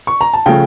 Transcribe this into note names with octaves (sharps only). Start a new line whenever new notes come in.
C#6
A#5
A5
C#3 F3 A3 G5